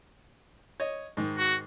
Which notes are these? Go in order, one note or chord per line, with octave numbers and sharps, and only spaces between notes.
C#5 D#5
G#2 D#3
F#4